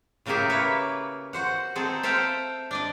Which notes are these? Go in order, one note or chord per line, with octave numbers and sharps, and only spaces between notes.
A2 C#3 A#3 G4 G#4 E5
A#3 E4 B4 C#5
F#4 C5 F#5
C4 D#4 G#4 A4
A4 C5 E5 F5 G5
D4 D5 D#5